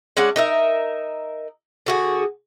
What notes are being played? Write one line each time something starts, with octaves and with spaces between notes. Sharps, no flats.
G#3 C#4 D4 F#5
D#4 A#4 E5
D3 F#4 G#4